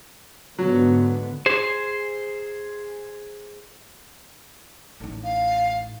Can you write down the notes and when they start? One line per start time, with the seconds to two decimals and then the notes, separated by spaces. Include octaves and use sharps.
0.58 G#2 D3 F#3 B3
1.46 G#4 C5
5.00 A1 D#4
5.24 F5